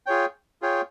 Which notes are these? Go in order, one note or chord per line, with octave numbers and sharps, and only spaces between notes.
F4 G#4 C#5 G5
F4 G#4 C#5 G5